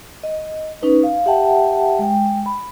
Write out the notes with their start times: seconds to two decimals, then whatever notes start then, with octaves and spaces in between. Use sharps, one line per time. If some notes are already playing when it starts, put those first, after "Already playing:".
0.23 D#5
0.82 C#4 D#4 B4
1.03 F5
1.26 G4 E5 F#5 G5 A5
1.99 G#3 G5
2.46 B5